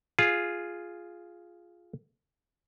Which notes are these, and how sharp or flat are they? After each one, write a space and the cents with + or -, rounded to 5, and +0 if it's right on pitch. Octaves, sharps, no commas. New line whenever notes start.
F4 +0 G#4 +0